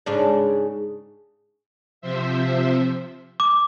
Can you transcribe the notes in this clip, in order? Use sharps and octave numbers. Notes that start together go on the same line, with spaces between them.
G#2 C#3 D4
C3 F3 C5 E5
D6